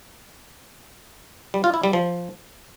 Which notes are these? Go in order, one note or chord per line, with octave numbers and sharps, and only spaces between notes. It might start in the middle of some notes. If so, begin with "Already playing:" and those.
G3
F4
E4
G3
F3